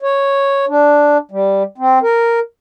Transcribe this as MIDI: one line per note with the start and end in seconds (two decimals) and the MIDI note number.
0.02 0.65 73
0.68 1.17 62
1.31 1.63 55
1.78 1.99 60
2.03 2.39 70